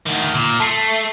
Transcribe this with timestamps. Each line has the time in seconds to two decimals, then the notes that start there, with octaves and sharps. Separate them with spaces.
0.06 D2 D#3
0.34 A#2
0.60 A3 A5 C7